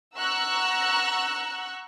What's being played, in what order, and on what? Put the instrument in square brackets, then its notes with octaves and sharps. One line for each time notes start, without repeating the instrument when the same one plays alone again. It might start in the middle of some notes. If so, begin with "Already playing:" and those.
[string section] F#5 A#5 C#6 E6 F#6